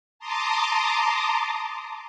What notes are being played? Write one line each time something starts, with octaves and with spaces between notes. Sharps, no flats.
A5 A#5 C6 D6 D#6